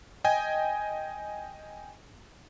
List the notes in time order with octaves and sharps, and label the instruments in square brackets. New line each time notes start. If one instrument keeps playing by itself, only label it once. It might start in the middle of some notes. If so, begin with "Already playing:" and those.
[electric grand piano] D#5 G5 G#5